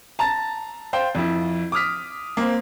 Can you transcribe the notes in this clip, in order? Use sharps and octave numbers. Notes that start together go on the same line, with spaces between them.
A5 A#5 A6
C5 F5 G5
F2 E4
D6 D#6 F6 B6
A#3 C4